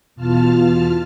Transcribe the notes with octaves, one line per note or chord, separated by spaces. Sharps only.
E2 B2 F4 A5 F6